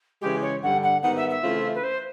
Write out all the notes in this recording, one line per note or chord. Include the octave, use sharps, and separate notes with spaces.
C#3 E3 G#3 G4
C#5
G2 D3 G3 F#5
F#5
G#2 D#3 G3 B3 F#5
E5
E5
C#3 E3 A3 C4 F4
B4
C5